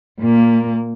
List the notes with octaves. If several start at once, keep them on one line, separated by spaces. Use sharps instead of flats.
A#2 A#3